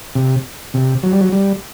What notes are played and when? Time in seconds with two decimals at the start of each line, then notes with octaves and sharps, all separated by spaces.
0.15 C3
0.74 C3
1.03 F#3
1.12 G3
1.21 F#3
1.32 G3